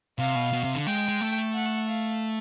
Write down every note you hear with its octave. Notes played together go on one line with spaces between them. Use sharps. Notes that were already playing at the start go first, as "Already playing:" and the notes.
C3 F5
B2
B2
C3
D3
G#3 G5
G#3
A3
F#5
F5